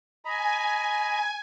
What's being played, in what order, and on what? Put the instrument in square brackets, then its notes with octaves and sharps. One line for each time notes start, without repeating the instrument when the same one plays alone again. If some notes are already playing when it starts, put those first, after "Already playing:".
[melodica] D#5 A#5 B5 [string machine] G#5